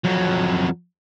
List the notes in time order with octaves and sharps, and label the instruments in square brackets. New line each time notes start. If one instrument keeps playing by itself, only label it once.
[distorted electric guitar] F2 F#3